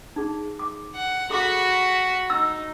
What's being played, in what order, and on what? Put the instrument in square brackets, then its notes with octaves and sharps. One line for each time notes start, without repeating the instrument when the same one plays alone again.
[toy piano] D#4 G#4
D6
[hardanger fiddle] F#5
[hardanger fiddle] F#4 B5 [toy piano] G#4 A4 D6
[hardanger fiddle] D#4 [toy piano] E6